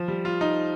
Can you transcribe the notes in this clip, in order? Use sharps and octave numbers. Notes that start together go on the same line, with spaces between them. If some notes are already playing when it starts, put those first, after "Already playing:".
Already playing: F3
G3
F4
D#4